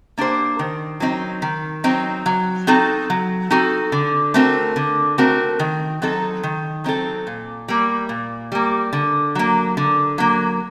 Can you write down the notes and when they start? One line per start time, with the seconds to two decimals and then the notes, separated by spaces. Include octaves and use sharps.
0.18 A#3 D4 G4 C5
0.59 D#3
1.00 F#3 C4 D#4
1.42 D#3
1.84 F#3 C4 D#4
2.26 F#3
2.67 C4 D#4 F#4 A4
3.10 F#3
3.51 C4 D#4 F#4 A4
3.92 D3
4.34 A3 C4 F#4 A#4
4.76 D3
5.18 A3 C4 F#4 A#4
5.60 D#3
6.02 F#3 C4 D#4 A4
6.43 D#3
6.84 F#3 C4 D#4 A4
7.27 A#2
7.68 G3 A#3
8.09 A#2
8.52 G3 A#3
8.93 D3
9.35 F#3 A#3
9.77 D3
10.18 F#3 A#3